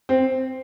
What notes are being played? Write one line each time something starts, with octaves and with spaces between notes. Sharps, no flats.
C4